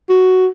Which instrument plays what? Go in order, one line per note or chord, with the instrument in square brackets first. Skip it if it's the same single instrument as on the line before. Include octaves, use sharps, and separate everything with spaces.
[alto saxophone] F#4